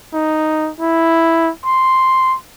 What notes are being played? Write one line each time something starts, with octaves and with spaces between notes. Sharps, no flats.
D#4
E4
C6